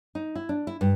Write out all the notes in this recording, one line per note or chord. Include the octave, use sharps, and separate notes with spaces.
D#4
E4
D4
E4
G2